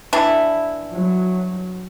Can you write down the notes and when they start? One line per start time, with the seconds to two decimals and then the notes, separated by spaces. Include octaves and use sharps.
0.13 E3 D4 E4
0.92 F#3